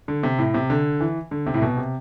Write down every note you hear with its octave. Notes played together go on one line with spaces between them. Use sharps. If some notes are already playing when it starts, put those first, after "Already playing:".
D3
C3
A2
C3
D3
E3
D3
C3
A2
B2
C3